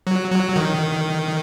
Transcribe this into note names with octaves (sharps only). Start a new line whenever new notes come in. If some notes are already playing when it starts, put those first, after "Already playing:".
F#3
F#3
D#3